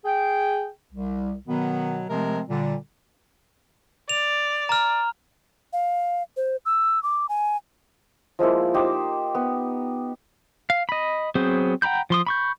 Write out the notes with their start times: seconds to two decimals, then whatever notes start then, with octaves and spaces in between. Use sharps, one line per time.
0.05 G#4 G5
0.93 C2
1.48 B2 D#3 F#3 B3
2.10 C3 F3 G#3 A3 C4 A#4
2.48 A#2 D3 G3
4.09 D5 F7
4.69 A#5 F6
5.73 F5
6.37 C5
6.66 E6
7.03 D6
7.29 G#5
8.39 F3 G#3 A#3 E4
8.74 D#4 G4 C5 D6
9.35 B3
10.70 F5
10.89 D#5 B5
11.35 F#3 B3 C4 G#4 C5
11.82 F#5 G5 A#5 B5 G6
12.10 F3 C6 D#6
12.27 B5 C#6 G6